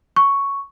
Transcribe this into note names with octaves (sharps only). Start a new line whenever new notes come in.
C#6